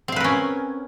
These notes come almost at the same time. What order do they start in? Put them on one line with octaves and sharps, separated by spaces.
C4 F5 B4 A#4 C#4